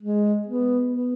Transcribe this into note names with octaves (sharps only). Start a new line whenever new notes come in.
G#3
B3
B3